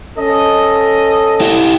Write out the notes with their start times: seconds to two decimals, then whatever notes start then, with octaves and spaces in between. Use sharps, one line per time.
0.18 C#4 A4 D#5
1.41 E4 G4